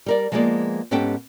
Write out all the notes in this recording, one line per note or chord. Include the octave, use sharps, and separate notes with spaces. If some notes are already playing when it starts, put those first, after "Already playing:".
G3 A#4 D5
F3 G#3 A#3 B3 G#4 D5
G#2 B3 C#4 G4 A4 G5